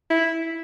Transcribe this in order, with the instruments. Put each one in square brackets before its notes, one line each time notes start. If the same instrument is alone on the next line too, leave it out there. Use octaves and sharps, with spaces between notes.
[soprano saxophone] E4